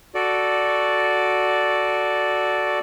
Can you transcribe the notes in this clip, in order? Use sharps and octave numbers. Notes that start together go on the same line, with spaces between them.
F#4 A4 D5